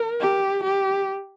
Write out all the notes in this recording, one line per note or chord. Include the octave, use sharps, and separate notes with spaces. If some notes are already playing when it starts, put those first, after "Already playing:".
Already playing: A#4
G4
G4